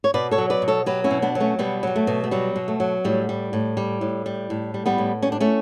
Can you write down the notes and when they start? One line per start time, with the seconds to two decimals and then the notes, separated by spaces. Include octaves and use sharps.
0.04 C#5
0.14 B2 B4 D5
0.31 A4 C#5
0.38 F#3
0.50 B4 D5
0.62 B2
0.68 A4 C#5
0.86 F#3 G4 B4
1.04 C#4 E4
1.11 B2
1.22 B3 D4
1.35 F#3
1.40 A3 C#4
1.59 B2 G3 B3
1.83 F#3 G3
1.96 A3
2.07 B2
2.24 A3
2.31 F#3 G3
2.56 B2
2.68 A3
2.80 F#3
3.04 A2 G3
3.29 G3
3.53 A2
3.77 G3
4.01 A2
4.26 G3
4.50 A2
4.74 G3
4.86 G3 B3
4.98 A2
5.22 G3 C#4
5.32 D4
5.40 A3 C#4